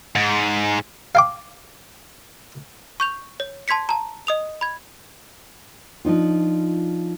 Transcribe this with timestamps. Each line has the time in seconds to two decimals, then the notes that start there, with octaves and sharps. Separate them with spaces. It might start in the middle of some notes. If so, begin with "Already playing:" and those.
0.16 G#2
1.15 F5 G5 D6
3.00 C#6 G6 F7
3.40 C#5
3.68 A5 C6 G#6 B6 C#7
3.89 A5 A#5
4.27 D#5 D#6 F7
4.61 B5 G#6
6.05 F3 D4 D#4 F4